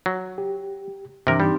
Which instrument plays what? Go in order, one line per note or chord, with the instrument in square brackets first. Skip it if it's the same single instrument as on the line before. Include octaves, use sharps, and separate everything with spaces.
[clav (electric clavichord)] F#3
[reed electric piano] G4
[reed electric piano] G2 E3 [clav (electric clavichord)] C3 A#4 [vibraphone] D4
[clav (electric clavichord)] G3 [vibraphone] C4 D#4 G4